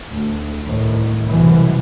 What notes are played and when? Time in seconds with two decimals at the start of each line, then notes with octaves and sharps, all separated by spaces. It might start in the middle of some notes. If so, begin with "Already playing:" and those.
0.12 D2
0.64 C2 A2 D#3
1.28 C2 F#2 B2 E3